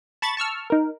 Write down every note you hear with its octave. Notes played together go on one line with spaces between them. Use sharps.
A5 B5 C#6 A6
A5 C#6 E6 F6
D#4 A#4